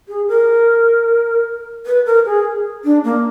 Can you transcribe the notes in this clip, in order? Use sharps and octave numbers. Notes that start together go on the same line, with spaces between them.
G#4
A#4
B4
A#4
G#4
D4
A#3